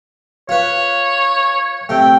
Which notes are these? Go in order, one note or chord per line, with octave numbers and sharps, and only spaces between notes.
F4 B4 C#5
C3 A3 G5